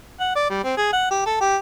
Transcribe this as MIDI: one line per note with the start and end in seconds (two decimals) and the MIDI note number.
0.20 0.31 78
0.35 0.47 74
0.50 0.63 55
0.64 0.75 60
0.77 0.88 68
0.92 1.08 78
1.11 1.22 67
1.26 1.37 69
1.41 1.56 67